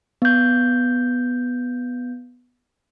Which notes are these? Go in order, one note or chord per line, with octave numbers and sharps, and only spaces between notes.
B3 G6